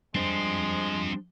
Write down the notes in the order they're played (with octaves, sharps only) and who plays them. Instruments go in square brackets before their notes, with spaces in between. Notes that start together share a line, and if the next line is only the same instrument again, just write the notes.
[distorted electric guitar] F3 C4 [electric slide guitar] G3 D4 C5 [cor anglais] G#3